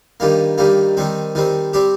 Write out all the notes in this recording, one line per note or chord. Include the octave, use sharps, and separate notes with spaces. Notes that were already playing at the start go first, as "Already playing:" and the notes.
G2 D#3 G3 A#3
G2 D#3 G3 A#3
D#3 G3 C4
D#3 G3 C4
G3 C4 G4